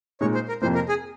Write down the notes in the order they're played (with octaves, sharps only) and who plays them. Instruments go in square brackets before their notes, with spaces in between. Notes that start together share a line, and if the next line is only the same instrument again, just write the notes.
[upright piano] A#2 G#3 D#4 [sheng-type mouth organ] C#5
[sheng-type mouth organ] C5
A#4
[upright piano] F2 C3 F3 A#3 [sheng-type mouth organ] C5
[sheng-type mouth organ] A#4
G#4